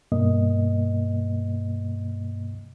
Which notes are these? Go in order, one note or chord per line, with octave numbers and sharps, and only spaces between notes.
G2 B2 A#3 D#5